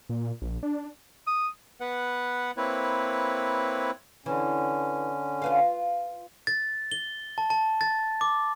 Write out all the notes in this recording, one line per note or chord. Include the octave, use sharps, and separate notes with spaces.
A#2
A#1
D4
D#6
B3 B4 F#5
A#3 C4 E4 B4 C#5
D3 E3 C#4
F4 B4 F5
A6
G7
A5
A5
A6
D6